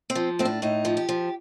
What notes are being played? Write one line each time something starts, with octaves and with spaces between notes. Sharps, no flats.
C4
F3
A2 C4
D4
A2 D#4
F3
G4
F3